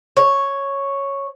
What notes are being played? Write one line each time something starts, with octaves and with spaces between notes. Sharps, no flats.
C#5